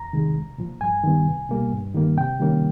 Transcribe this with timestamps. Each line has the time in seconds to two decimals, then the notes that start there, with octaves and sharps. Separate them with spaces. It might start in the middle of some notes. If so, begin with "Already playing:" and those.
Already playing: E2 A#5
0.13 C3 D#3 G#3
0.35 C2
0.58 A#2 F3
0.81 G2 G#5
1.04 D#3 G3 B3
1.26 C2
1.49 B2 G3 A#3
1.72 G2
1.94 D#3 G3 A#3
2.17 C3 G5
2.40 D#3 G3 A#3 C#4